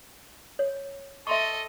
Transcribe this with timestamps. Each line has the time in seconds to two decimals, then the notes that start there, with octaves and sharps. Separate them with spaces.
0.59 C#5
1.27 A4 D#5 E5 C6 C#6